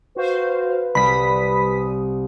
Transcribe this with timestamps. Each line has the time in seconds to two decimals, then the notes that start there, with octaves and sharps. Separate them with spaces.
0.16 F#4 B4 C5 F5
0.95 C2 G3 B5 D#6 B6